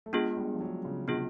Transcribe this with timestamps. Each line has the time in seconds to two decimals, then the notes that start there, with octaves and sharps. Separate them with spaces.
0.06 A3
0.13 G#3 B3 D4 F4 G#4
0.37 G3
0.54 F3
0.61 F#3
0.85 C#3
1.08 C3 B3 D4 F4 G#4